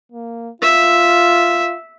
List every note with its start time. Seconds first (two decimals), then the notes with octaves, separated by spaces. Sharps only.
0.12 A#3
0.62 F4 E5